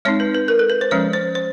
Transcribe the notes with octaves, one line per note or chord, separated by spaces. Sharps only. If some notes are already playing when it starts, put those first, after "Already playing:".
G#3 C4 D#4 C#5
B4
B4
A#4
A4
B4
C5
F3 G#3 C#4 C#5
C5
C5